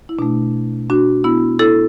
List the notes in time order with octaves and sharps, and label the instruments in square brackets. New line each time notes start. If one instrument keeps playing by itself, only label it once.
[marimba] E4
B2 A3 D4
D4 F#4
B3 E4
E4 A4